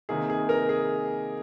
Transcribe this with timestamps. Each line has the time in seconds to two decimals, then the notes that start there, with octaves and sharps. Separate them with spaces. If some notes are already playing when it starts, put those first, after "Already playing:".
0.09 C3 D#3 A#3 D#4 G#4
0.30 G#4
0.49 A#4
0.69 G#4